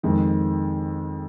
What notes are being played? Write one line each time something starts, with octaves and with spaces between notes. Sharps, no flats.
F2 D#3 G#3